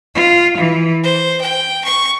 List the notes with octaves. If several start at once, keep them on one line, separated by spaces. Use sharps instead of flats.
F4
E3
C5
G5
C#6